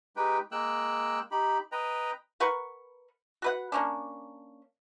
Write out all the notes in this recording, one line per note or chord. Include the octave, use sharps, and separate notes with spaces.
G#3 D#4 G4 B4 G5
G#3 A#3 G5 E6 F#6
D#4 G4 B5
B4 D#5 G5 A#5
A#4 B4 F#5 C#6
F#4 B4 F#5
A#3 C#4 D4